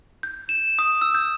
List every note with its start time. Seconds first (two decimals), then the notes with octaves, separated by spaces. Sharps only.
0.23 G6
0.49 E7
0.79 D#6
1.01 E6
1.15 G6